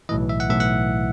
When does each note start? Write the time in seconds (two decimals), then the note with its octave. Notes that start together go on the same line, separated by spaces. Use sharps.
0.09 B1 A2 E3 D#5
0.29 E5
0.40 F#5
0.50 B1 A2 E3 E5
0.60 F#5